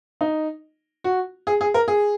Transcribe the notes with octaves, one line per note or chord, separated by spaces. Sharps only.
D#4
F#4
G#4
G#4
A#4
G#4